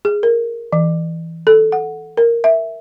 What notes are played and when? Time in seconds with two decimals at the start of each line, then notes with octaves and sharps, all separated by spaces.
0.05 G#4
0.23 A#4
0.73 E3
1.47 A4
1.72 F#5
2.17 A#4
2.44 E5